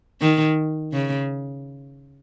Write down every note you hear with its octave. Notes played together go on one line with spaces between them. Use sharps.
D#3
C#3